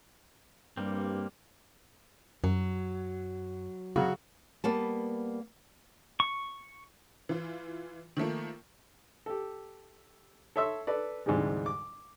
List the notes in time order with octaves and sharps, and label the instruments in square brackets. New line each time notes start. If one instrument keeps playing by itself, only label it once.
[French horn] G2 [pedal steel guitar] G3 A#3 C4
[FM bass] F#2 [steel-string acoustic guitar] F#3
[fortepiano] C#3 F#3 [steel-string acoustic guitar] F#4
[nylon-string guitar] G3 A#3 B3 A5
[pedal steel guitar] C#6
[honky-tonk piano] E3 F4
D#3 F3 A3 A#3
[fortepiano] G4 A4
A4 C#5 E5 C6 E6
A4 B4 D5
D2 G#2 C3 E3 G3 G#3
D6